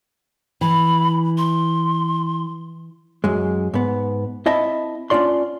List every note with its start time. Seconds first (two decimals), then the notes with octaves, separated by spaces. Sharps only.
0.61 E3 B5
1.38 C6
3.24 F#2 G#3
3.74 G#2 B3
4.46 C4 E4 D#5 E5 A5
5.10 C#4 D4 F4 D5 C6